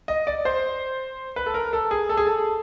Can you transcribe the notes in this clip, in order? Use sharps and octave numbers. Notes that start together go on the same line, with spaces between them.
D#5
D5
C5
B4
A4
A#4
A4
G#4
A4
G#4
A4